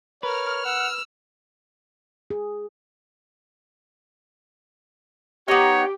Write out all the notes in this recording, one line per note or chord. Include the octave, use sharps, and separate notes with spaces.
A#4 B4 C#5 F6
F#5 E6
G#4
B3 D#4 G4 C#5